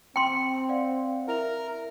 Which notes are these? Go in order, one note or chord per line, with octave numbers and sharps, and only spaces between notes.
C4 G5 C6
D5 F5 F#5
E4 A#4 E5 F7